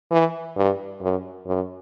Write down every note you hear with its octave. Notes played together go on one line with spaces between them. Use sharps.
E3
G2
F#2
F#2